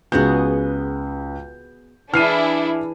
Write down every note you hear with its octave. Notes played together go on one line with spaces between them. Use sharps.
C#2 B3 F#4 G#4 G6
E3 D4 E4 G#4 F6 C7 D#7